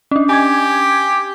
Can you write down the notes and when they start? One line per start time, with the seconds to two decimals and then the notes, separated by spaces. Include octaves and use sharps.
0.11 C#4 D4
0.29 G4 G#5 G#6